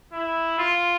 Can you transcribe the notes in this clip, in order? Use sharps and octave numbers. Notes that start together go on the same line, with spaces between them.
E4
F4